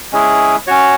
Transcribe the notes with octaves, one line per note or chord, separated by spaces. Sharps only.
G#3 C#4 E4 G#4
C#4 F#4 C#5